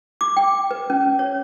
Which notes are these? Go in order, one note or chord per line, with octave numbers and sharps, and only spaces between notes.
D6
G5
B4
C#4
C#5